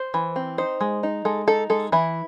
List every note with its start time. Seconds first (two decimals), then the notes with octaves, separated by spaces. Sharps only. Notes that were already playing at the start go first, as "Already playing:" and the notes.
Already playing: C5
0.14 E3
0.36 C4
0.58 D#4 C5
0.81 G#3
1.03 D#4
1.25 G#3 A4
1.47 D#4 A4
1.70 G#3 A4
1.92 E3 E4